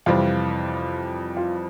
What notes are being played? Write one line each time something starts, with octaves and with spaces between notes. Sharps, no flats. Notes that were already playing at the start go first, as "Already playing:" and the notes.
F2 C3 E3 G3 F4
F4